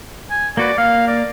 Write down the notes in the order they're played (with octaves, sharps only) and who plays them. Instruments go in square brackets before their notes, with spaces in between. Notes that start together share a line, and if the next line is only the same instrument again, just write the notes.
[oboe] G#5
[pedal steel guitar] A#3 F#4 B4 [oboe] D5
[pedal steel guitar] A#3 [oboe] F5
[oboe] D5